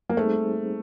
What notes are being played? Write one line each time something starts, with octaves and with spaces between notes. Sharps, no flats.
A#3
G3 A3 C4 D#4 G#4 C5